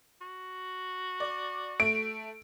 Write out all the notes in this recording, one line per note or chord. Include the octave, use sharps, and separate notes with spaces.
F#4
D5
A3 D7